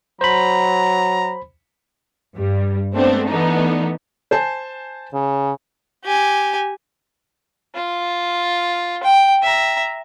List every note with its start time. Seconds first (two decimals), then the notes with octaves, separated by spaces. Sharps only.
0.21 F#3 C5 A#5 B5
2.36 G2 G3
2.94 G#3 A3 B3 C4 D4
3.29 E3 A3 B3 D4 D#4
4.31 C5 G#5 A5
5.14 C#3
6.05 G4 G#5
7.75 F4
9.03 G5
9.42 E5 A#5